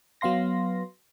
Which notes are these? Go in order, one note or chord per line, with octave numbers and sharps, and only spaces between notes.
F#3 B3 F5 C6 A#6